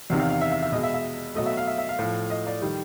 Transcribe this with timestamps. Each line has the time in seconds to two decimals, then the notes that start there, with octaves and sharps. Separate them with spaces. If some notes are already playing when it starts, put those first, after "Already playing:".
0.10 E2 C3 D#3
0.19 F5
0.30 F5
0.41 E5
0.52 E5
0.62 E5
0.72 B2 G#3 D#5
0.83 E5
0.94 E5
1.35 B2 F#3 A3 D#5
1.46 E5
1.57 F5
1.67 E5
1.78 E5
1.89 F5
1.99 A2 F3 A3
2.30 D#5
2.47 D5
2.62 D#3 G3